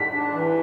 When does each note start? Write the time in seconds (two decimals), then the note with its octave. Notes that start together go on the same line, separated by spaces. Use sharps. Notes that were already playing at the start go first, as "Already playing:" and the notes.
Already playing: B6
0.12 D4
0.33 E3